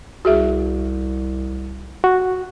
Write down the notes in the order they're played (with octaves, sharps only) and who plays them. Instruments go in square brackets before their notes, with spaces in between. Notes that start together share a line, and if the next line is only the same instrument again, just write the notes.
[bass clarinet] C2 [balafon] F#4 G#4 E5
[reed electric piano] F#4